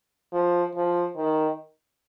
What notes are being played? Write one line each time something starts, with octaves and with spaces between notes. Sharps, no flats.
F3
F3
D#3